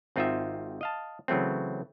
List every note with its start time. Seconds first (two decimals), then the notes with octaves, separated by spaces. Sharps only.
0.16 G#1 C4 D#4 F4 D#5 E5
0.81 D#5 F5 A5
1.28 C#3 E3 F#3 A3 C4